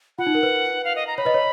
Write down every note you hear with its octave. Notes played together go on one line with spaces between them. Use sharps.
F4 F#5
D#4
A#4
B4
F5
D#5
A#5
C#5 B5
B4 D#5
C#5